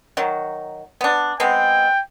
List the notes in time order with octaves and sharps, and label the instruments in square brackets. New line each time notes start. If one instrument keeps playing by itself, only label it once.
[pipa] D#3 F#3
B3 D4
[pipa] G#3 B3 C4 [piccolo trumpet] G5